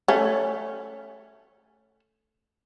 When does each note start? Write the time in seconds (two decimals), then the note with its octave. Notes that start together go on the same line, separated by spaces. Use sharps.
0.08 A3 C#4